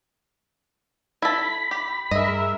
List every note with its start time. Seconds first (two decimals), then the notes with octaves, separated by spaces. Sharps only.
1.22 E4 A4 B5
1.71 G4
2.11 G2 G#4 A#4 D#5 E5